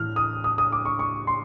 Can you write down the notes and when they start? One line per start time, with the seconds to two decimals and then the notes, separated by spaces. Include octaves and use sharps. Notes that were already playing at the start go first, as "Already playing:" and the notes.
Already playing: A2 E3 F6
0.16 D#6
0.44 D#6
0.58 D#6
0.72 D6
0.85 C#6
0.99 C#6
1.27 C6